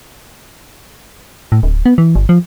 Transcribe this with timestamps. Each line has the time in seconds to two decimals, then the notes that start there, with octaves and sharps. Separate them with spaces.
1.52 A2
1.63 D1
1.86 B3
1.98 E3
2.15 G1
2.29 F3